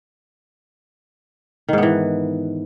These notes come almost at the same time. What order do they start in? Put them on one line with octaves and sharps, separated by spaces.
D#3 G#2 B3 E3